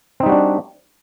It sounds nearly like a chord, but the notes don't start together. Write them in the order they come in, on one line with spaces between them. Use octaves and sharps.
C4 D#4 G3 F#4 D4